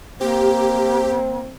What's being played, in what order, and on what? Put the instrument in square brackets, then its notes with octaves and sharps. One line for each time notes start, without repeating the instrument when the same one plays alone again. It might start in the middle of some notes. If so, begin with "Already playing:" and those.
[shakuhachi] A#3 [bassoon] C4 [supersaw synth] G4